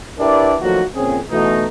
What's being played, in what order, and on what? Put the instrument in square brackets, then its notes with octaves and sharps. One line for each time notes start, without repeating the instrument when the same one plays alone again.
[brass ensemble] D4 E4 G4 A#4 B4 D5
D#3 F3 F#3 A3 A#3 F#4
F2 A#2 C#3 C4 C#4 G#4
B2 E3 A3 D#4